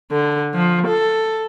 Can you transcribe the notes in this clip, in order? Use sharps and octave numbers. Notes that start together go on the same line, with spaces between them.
D3
F3
A4